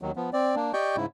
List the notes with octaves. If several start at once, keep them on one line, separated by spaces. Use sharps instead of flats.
D#2 D#3 F#3
F3 B3
C4 D5
A#3 D4
G4 D5 D#5 G5 C#6 G6
G#2 C#3 E4